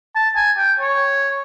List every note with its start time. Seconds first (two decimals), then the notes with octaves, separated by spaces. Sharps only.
0.15 A5
0.36 G#5
0.57 G5
0.80 C#5